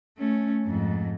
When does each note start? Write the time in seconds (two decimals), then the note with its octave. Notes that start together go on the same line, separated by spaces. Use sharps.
0.18 A3 C#4
0.66 F2 G#2